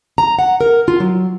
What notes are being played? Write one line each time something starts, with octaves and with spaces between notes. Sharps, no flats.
A#5
F#5
A#4
F4
F#3